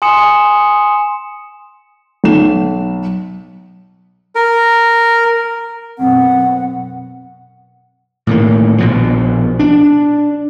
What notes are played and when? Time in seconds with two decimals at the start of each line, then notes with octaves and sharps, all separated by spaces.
0.02 G#5 C6 D#6 C#7 E7
2.24 B1 E7
4.35 A#4
5.99 F#2 B2 C4 F#5
8.27 A2 D#3 A#3
8.78 A#1 B2 F3
9.59 D4